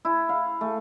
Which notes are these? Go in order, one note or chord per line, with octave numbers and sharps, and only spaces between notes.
E4
F5
A3